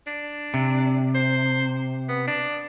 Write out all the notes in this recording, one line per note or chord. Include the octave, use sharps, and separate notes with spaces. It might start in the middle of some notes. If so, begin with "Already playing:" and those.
D4
C3
C5
B3
D4